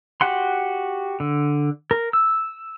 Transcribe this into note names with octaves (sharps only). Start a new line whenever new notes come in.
F#4 G4 F#5 C6
D3
A#4
E6